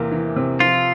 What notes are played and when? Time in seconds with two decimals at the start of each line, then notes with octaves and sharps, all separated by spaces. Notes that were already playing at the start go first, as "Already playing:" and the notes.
Already playing: E2 C3 A#3
0.12 E3
0.36 C3
0.60 F3 F4